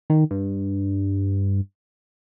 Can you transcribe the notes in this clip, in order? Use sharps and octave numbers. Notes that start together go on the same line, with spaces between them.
D#3
G2